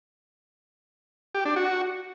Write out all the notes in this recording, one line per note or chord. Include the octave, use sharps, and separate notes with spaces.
G4
D4
F#4